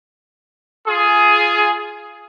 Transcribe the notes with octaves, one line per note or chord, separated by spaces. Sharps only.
F4 G#4